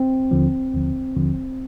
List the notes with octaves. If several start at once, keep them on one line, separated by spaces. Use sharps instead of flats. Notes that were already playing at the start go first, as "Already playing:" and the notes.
Already playing: C4
D#2 D3 F3
D#2 D3 F3
D#2 D3 F3